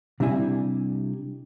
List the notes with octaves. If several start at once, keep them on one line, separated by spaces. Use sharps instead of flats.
C3 G3 D4 E4 G#5